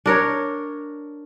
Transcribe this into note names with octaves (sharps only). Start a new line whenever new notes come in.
D4 A#4 C#5